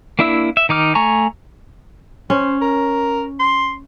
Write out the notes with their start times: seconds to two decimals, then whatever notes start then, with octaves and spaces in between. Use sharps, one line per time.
0.19 A#3 D4 E4 E5 E6
0.57 E5
0.69 D#3 D#4 D6 F6
0.95 A3 G#5 A#5 C#6
2.30 C#4 C5
2.61 A#4
3.39 C6